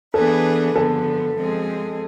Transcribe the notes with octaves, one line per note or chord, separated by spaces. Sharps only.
E3 B3 D4 G#4 A4 B4
D3 F3 B3 A4
F3 G#3 C4 G#4